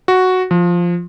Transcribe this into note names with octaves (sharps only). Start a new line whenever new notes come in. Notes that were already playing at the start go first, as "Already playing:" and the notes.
F#4
F3